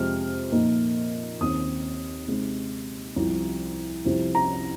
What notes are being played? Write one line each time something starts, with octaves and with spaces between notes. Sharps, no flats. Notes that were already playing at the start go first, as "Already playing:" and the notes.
Already playing: F2 C3 G#3 F6
A#2 F3 A#3 D#4
D#2 D#3 C4 D#6
C3 G#3 C4 D#4
C2 C3 F3
C2 C3 F3
A#5